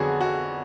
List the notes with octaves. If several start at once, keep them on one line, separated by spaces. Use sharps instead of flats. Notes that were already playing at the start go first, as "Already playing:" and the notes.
Already playing: F2 D3 F#3 B3 F#4 G#4
F#4